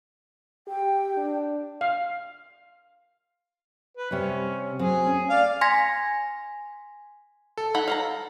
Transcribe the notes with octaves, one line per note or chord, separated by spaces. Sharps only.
G4 G5
D4
F5
B4
C3 G3 C#4
F#3 C4 G#4
C#4
A3 D5 F5
G#5 C6 G#6 A#6 B6
A4
D#4 F#5 B5
F5 F#5 A#5